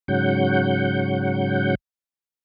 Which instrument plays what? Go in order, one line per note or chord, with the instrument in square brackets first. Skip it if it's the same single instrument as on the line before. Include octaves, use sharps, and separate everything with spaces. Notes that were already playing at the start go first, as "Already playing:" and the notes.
[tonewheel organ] G#2 C#3 F#3 F#5 G6